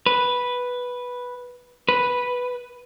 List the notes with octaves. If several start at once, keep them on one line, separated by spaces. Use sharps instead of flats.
B4
B4